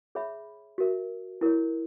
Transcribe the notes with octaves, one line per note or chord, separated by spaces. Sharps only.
G#4 C#5 E5 B5
F#4 A#4 E5
E4 A#4 C#5